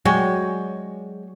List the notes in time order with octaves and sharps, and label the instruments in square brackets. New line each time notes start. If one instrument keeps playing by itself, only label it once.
[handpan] F#3 C#5 D5 [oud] G#3 [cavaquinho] F#4 G5 G#5